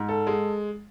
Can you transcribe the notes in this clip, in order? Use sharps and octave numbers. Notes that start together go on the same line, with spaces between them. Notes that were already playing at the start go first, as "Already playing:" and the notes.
Already playing: G#2
A4
G#3